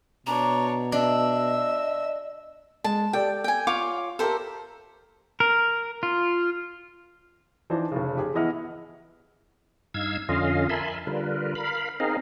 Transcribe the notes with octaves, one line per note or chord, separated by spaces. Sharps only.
B2 D4 C#5 A#5
D4 D#5 E5 E6
G#3 A5
G4 A4 D5 G5
G5 G#5
F4 C#5 F5 D6
G4 A4 A#4 C5 E5
A#4
F4
E3 F3 D4 D#4 C5
F1 C#3
G4 G#4
E3 B3 E4 D#5 F#5 F6
G2 D#4 F5 E6 G#6
F2 D3 C#4 F4 D#5 F5
A#4 E5 G#5 A5 B5 C6
D3 G3 F4 A#4 B4
A#4 F5 B5
C4 D#4 G#4 A#4 D#5 F5